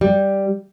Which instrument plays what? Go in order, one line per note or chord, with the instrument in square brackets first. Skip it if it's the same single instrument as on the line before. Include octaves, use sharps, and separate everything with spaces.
[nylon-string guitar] G3